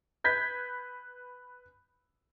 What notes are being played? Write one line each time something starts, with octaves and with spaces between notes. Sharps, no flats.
B4 G6 G#6 B6